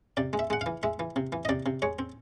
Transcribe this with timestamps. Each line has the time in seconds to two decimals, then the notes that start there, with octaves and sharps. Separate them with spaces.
0.17 C3 D5
0.33 G#3
0.39 E5
0.50 G#3 F#5
0.61 F5
0.66 E3
0.83 G#3 E5
1.00 E3
1.16 C3
1.32 E3
1.45 D#5
1.49 C3 D5
1.66 C3
1.82 G#3 C#5
1.99 C4